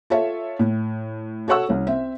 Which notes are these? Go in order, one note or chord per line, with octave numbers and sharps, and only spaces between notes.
F4 A4 C#5 E5
A2
F#4 A4 C#5 F#5 C#6 E6
C2 C#4
C4 E5